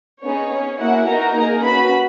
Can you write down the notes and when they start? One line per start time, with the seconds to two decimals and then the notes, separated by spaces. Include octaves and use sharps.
0.22 B3 C#4 D#4 G#4 C#5
0.51 C#4 G#4
0.79 A#3 E4 F#4 G#4 F#5
1.07 B3 D#4 F#4 A#4 A#5
1.35 A#3 D#4 G#4
1.63 C#4 F#4 B4 B5